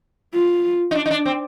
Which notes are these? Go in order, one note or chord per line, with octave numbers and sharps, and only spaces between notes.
F4
D#4
D4
D#4
D4
C4